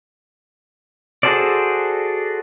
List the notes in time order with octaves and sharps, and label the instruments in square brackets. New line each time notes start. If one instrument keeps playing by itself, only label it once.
[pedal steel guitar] F#4 G#4 A4 C5 D5